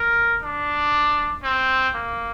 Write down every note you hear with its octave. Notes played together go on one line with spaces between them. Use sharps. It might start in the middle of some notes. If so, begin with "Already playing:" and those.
Already playing: A#4
D4
C4
A#3